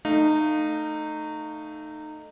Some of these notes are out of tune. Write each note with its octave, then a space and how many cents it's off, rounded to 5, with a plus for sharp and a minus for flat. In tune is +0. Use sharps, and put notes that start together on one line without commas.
A3 +0 D#4 -20 F5 +0